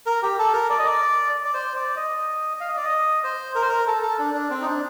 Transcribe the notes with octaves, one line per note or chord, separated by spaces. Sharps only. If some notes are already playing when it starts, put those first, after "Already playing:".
A#4
G4
A4
A#4
D5
D#5
D5
D5
C5
D5
D#5
F5
D#5
D5
D#5
C5
A#4
C5
A#4
A4
A4
D4
D4
C4
D#4
D4